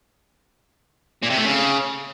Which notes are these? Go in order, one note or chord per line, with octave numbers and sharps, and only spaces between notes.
A#2
C3
A3
C#3